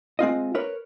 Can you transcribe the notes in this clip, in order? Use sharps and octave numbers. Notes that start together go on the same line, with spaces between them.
G#3 C4 F4 D#5
A#4 B4 C#5